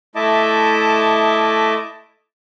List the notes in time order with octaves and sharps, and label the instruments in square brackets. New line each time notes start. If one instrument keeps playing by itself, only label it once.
[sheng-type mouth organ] A3 E4 D#5 E5 A5 D6